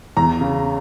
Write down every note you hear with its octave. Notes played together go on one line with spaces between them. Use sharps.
E2 A#5
C#3